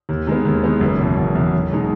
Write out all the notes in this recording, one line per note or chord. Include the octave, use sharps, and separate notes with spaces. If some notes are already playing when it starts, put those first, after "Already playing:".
D#2
D#3 G#3 B3
D#2
D#3 G#3 B3
F#1
E2 B2
F#1
E2 B2
B1
B2 G#3 D#4